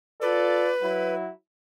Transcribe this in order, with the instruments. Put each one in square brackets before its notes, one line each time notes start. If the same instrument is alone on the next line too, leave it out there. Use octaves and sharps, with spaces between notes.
[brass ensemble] F4 A4 D5 [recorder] B4
[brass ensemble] F#3 E4